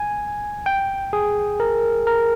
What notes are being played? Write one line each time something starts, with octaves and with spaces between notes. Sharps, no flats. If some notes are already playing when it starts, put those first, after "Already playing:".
Already playing: G#5
G5
G#4
A#4
A#4